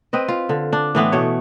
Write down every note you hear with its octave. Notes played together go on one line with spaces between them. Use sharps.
C4 B4 D#5
F4
D3
D4
A2 E3 B3 C4
B2 A3 C#5